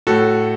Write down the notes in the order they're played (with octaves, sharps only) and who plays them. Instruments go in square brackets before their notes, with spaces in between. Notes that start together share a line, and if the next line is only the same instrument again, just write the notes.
[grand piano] A2 F#4 A4